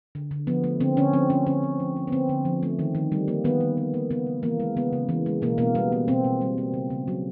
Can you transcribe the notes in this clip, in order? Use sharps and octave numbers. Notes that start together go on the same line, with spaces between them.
D3
D3
F3 B3
A3
D3 C4
D3 C#4
F3 C4
A3 C#4
D3 C#4
D3
F3
A3
B3
D3 C4
D3
F3
A3
D#3
D#3
G3
A#3
D#3 B3
D#3
G3
A#3
C#3 B3
C#3
E3 A#3
G#3
C#3 B3
C#3
E3
G#3
B2 A#3
B2 A#3
G3 B3
A#3
B2 C4
B2
G3
A#3
C#3
C#3
F#3